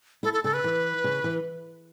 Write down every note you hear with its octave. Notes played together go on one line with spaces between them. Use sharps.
E4 A4
A4
C#3 A4
B4
E3
C#3
E3